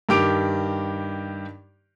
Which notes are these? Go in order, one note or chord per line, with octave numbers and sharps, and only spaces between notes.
G2 D#3 G4 D6 D7 F7